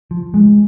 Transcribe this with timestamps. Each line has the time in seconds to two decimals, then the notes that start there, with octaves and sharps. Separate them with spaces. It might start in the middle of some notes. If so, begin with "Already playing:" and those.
0.11 F3
0.34 G#3